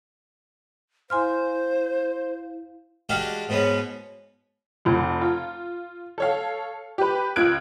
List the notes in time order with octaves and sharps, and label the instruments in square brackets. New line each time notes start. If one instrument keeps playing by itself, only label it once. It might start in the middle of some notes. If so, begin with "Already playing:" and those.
[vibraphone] E4 F5 [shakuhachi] C5 [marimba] G#5 C6 F6
[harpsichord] G#3 D4 F#4 G4 F5
G#2 B2 B3 C#4
[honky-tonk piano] F1 F2
F4
A4 C#5 F5
G4 B4
C#2 F4 F#6 G#6 D7